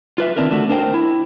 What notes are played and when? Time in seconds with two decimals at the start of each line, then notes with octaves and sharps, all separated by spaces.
0.18 F4 B4 E5
0.36 D#3 G#3 C4 D4 E4 A#4
0.51 D3 A3 F#4
0.69 D4 A#4 C5 F#5 G5
0.94 E4